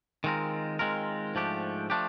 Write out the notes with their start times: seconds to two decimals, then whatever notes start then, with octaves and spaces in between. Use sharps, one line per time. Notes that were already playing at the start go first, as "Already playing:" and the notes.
0.24 D#3 G#3 C4 F4 A#4
0.79 D#3 G#3 C4 F4 A#4
1.35 G#2 F3 A3 D4 G4
1.90 F3 A3 D4 G4